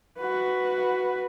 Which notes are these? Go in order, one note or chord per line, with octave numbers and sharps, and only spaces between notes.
F#4 B4